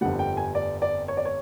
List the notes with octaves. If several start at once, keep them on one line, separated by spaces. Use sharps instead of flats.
G1 F2 D3 G3 F#5
G5
G#5
D5
D5
C#5
D5
C#5